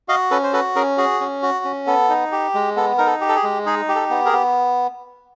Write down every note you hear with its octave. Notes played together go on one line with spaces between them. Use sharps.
F#4 D#5 F5
C#4 A4 B4
C5
F#4 A4 B4
C#4 G#4 A#4
F#4 G#4
C#4
F#4
C#4
B3 A4
D#4
G4
G#3
B3 A4
D#4 A#4
A4
G4
A4
G#4
G#3
D#4 G#4
G4
A4
B3
G#4 A#4
B3